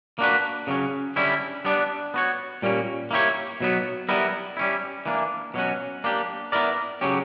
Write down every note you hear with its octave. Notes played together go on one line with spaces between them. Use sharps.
A#3 D4 F#4 B4
C#3 F#3 C#4
D3 G3 C#4 E4
G3 B3 D4
B3 F#4 C#5
A#2 G3 A#3 C#4
A#3 E4 G4 C#5
B2 F#3 B3
G3 B3 E4 A#4
G3 C#4 E4
E3 A#3 D4
B2 F#3 C#4 F#4
A#3 D4 G4
B3 E4 A#4 D5
C#3 F#3 C#4 G4